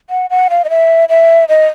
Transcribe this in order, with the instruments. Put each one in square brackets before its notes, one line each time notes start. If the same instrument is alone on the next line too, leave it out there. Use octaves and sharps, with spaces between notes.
[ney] F#5
F#5
F5
D#5
E5
E5
D#5